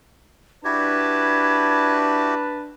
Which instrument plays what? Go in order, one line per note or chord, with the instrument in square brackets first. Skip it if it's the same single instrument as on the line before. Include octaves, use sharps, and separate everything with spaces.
[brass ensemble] D4 A5 [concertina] E4 F#4 G4 [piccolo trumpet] B4 [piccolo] G#6